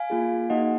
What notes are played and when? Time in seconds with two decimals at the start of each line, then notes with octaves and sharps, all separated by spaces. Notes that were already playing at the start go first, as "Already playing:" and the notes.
Already playing: F5 G#5
0.10 A#3 F4 G#4
0.50 A#3 D#4 F#4 D#5 F#5